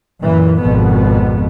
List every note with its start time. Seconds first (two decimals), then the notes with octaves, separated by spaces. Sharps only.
0.22 F#2 A#2 E3
0.62 G#1 F2 B2 B3